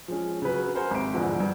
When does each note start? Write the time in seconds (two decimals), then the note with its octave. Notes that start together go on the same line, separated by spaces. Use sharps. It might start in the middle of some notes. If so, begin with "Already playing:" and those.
0.08 F3 G#3 C#4
0.42 C#3 F#3 B4
0.75 A#4 C5 F#5 G#5
0.91 G#1 C3 D7
1.14 A#1 E2 G#2 D3 F3
1.40 G2